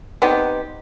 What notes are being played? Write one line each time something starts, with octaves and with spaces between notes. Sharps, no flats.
B3 C4 D#4 G4